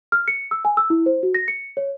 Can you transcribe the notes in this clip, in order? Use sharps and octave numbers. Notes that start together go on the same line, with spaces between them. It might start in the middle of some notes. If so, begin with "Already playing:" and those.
F6
C#7
E6
G#5
E6
E4
C5
F#4
A#6
C#7
C#5